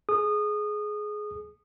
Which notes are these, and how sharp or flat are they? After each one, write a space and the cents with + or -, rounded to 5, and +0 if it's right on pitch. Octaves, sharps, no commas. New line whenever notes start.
G#4 +20 D#6 -25